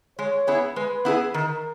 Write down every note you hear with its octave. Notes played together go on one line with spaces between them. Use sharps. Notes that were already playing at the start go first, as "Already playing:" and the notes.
G#3 C#5
B3 E4 G#4
G#3 B4
B3 E4 G#4
D#3 A#4